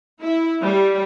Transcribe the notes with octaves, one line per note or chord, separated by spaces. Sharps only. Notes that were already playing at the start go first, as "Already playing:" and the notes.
E4
G3